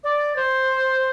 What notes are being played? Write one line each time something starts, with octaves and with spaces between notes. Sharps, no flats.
D5
C5